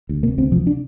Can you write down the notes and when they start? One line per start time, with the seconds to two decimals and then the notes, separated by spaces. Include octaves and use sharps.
0.09 D2
0.23 C3 A#3
0.38 D2 C4
0.52 C3 F3
0.67 D4